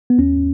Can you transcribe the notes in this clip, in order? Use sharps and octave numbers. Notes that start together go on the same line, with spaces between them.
B3
D#2 C#4